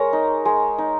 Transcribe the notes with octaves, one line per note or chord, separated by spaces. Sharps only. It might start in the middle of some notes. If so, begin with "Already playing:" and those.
Already playing: G#3 A#4 C#5 A#5
D#4
G#3
D#4